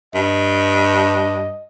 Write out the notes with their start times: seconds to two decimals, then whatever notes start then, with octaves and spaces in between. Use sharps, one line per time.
0.15 G2 D#5